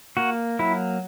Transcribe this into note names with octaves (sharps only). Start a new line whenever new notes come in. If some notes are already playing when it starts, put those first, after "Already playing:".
A#3 F#4
F#3 E4